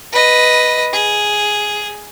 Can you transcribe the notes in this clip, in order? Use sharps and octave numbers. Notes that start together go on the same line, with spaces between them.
B4 D#5
G#4